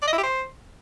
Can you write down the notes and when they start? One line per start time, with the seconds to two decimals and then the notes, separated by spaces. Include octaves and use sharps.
0.02 D5
0.08 D#5
0.13 E4
0.18 G4
0.23 C5